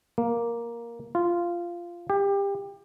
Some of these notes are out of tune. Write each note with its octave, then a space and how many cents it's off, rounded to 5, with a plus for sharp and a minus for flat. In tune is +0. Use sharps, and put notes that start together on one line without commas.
A#3 +5
F4 -10
G4 +25